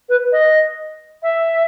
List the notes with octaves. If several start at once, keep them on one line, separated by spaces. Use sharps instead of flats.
B4
D#5
E5